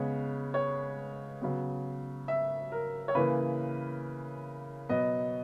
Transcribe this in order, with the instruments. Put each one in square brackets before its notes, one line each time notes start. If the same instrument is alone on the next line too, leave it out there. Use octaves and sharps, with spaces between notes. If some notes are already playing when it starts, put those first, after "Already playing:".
Already playing: [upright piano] C#3 G#3 B3 C#5
C#5
C#3 F#3 B3
E5
A#4
C#5
C#3 E3 A#3 B4
B2 F#3 B3 D#5